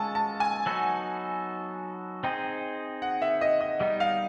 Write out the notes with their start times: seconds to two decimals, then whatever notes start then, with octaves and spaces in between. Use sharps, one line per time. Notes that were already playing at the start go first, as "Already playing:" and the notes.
Already playing: G#3 C#4 F4 A4 G#5 A5
0.15 A5
0.40 G#5
0.66 F#3 B3 D#4 F#4 A4
2.24 C4 D#4 G#4 C5 G5
3.02 F#5
3.22 E5
3.41 D#5
3.61 D#5
3.80 G3 B3 D#4 D#5
4.00 F5